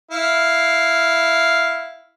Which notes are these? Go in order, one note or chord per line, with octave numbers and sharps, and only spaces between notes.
E4 F5